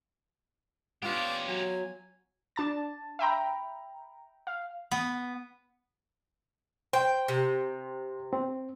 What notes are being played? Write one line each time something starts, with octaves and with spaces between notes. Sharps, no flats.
B3 C#4 D4 F4 G4
F#3 G#5
D4 A5 A6
E5 G5 A#5 B5
F5
B3
C5 G5
C3
C4